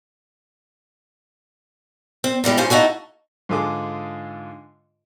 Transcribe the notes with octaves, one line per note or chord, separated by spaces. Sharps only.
C4
A#2 E3 G3 G#3
G2 A#2 C#4 F4 C5
A#3 D#4 E4 F#4 A4
G#2 D3 F4 G#4 A4 D6